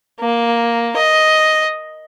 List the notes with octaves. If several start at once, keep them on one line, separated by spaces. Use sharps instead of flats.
A#3
D#5